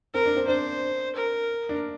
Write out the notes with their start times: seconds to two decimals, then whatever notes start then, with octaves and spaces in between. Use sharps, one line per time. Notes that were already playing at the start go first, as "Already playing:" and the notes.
0.14 C4 A#4
0.26 D4
0.37 C4
0.47 D4 C5
1.15 A#4
1.69 D4